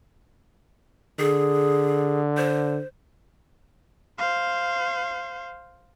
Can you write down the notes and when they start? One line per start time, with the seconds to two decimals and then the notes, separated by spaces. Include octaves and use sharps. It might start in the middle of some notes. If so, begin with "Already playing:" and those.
1.19 D3 G#4
2.37 C5
4.18 C5 F5